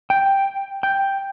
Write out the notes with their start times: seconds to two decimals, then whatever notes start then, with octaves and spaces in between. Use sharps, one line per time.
0.10 G5
0.83 G5